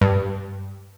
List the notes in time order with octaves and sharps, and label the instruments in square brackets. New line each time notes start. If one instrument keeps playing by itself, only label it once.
[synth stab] G2